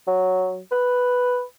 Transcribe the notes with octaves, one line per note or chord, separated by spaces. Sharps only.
F#3
B4